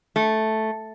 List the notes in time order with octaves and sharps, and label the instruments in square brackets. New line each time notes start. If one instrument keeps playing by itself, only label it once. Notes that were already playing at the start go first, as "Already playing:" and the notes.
[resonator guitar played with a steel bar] A3